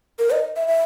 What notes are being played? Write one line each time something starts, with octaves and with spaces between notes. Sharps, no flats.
A#4
D#5
E5
E5